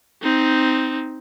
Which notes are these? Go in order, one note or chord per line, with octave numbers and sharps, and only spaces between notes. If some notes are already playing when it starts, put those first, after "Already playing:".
C4 D#4